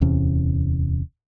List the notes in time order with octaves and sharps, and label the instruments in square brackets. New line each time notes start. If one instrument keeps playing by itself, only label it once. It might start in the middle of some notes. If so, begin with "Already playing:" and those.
[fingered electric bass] D1 E2 C3 C#4